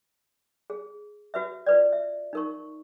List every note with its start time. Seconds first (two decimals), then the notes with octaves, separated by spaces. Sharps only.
0.70 G#4
1.34 F#4 B4 E5
1.66 F4 B4 D5
1.92 E5
2.33 D#4 A#4 C#6